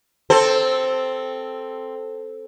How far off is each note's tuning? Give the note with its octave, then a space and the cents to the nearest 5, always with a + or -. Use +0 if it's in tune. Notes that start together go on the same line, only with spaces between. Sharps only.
C4 +0 A4 +0 C5 +0